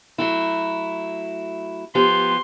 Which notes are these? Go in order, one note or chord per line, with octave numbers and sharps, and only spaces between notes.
F#3 A3 E4
F3 B3 G4 C6